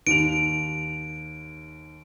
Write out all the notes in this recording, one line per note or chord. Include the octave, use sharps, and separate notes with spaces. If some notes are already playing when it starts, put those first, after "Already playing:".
D#2 D7 F7